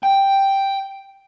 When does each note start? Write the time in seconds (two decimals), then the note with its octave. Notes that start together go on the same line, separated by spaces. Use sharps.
0.03 G5